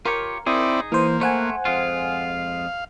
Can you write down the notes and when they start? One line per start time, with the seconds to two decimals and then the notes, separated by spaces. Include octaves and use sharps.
0.05 F4 G4 A#4 C#5
0.47 C4 D#4 E4 G#4 D5
0.92 E3 A#3 C5
1.21 A3 C5 F#5 G#5
1.65 F2 G#3 F4 F5